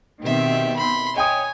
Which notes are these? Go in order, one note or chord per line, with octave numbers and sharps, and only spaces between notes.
B2 D#3 C4 G4 E5
B5 C6
C#5 D#5 G5 G#5 D#6